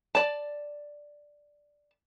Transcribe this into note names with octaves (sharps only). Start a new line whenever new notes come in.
D5 A5